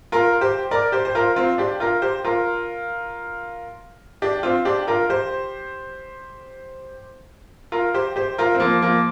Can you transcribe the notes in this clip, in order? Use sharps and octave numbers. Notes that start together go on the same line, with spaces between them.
F4 A#4
G4 C5
A#4 D5
G4 C5
C5
F4 A#4
C4 F4
D4 G4
F4 A#4
G4 C5
F4 A#4
D4 G4
C4 F4
D4 G4
F4 A#4
G4 C5
F4 A#4
G4 C5
G4 C5
F4 A#4
C4
F3 A#3
F3 A#3